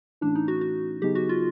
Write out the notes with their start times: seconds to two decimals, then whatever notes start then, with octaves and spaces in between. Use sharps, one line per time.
0.21 A2 E3 A3 C#4 D4 E4
0.35 D#4
0.48 F#4
0.61 F#4
1.02 C#3 F#3 B3 D#4 G4 G#4
1.15 F#4
1.29 F4